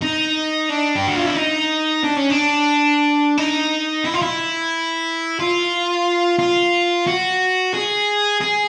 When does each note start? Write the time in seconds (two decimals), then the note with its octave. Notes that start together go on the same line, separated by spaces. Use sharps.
0.02 D#4
0.70 D4
0.96 G4
1.07 F#4
1.16 F4
1.26 E4
1.36 D#4
2.04 D4
2.16 C#4
2.30 D4
3.38 D#4
4.04 E4
4.14 F4
4.22 E4
5.39 F4
6.39 F4
7.07 F#4
7.74 G#4
8.41 G#4